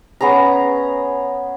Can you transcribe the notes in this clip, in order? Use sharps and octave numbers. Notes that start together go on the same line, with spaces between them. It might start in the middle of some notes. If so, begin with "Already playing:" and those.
B3 C#4 G#4 A#5